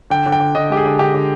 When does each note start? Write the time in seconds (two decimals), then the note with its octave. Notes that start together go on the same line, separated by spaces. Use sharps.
0.10 D3 G5
0.26 D3
0.32 G5
0.40 D3
0.55 D3 D#5
0.70 G#3 G4
0.77 G#4
0.85 D3
0.99 D3 G4
1.14 D3